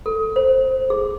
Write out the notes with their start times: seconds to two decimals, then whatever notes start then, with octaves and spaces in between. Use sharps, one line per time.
0.06 A4
0.36 C5
0.90 G#4